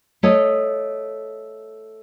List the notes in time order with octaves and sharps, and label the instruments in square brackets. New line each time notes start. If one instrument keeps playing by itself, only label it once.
[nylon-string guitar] A3 C#5 D#5